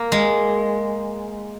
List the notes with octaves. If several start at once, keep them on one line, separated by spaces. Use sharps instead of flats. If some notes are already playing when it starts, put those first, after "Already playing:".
Already playing: A#3
G#3